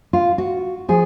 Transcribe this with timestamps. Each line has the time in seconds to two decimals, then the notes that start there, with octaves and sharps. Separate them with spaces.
0.13 F4
0.38 F#4
0.89 F3 G#4